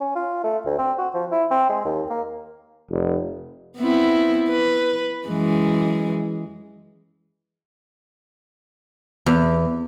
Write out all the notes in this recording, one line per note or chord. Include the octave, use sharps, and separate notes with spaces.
C#4
F4
A3
D2
C4
F#4
F3
E4
C4
G#3
D#2
A#3
F1
B3 C4 E4
B4
F#2 E3 G#3
E2